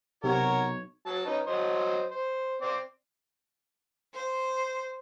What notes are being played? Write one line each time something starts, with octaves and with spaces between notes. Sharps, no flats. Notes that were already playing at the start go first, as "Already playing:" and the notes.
B1 C3 F#4 A#4 C#5
F#3 A5
C#4 D#4 B4
F#3 C5 D#5
C5
C4 C5 D5
C5